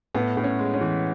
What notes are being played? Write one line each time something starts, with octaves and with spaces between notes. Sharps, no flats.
A2 B3
A2
C#4
G#3
C#4
E3